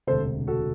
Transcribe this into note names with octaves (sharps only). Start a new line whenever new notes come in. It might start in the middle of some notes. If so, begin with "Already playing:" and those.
E1 D2 C3 A4 C5
F#4 A4